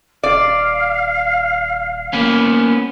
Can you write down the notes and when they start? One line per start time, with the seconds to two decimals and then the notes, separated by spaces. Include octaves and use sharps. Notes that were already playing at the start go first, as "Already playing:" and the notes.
0.23 D#1 D5 F5
2.13 A#3 B3 C#4